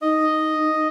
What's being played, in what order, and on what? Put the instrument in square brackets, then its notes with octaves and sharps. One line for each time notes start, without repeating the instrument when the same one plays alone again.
[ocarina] D#4 [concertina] D#5